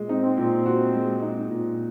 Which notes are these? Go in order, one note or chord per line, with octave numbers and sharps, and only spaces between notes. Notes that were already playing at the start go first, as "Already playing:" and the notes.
Already playing: A#2 G#3
C4 D#4
A#2
F#4
G#3
D#4
A#2